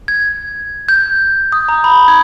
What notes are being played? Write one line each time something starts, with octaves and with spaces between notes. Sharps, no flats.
G#6
G6
D#6
A#5
B5
G#6